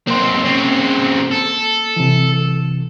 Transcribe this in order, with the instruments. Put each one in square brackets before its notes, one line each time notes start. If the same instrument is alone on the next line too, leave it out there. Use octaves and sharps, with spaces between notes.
[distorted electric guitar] B1 C4 [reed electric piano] A#3 C6
[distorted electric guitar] C#3 C4
A4
[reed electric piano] C3 E3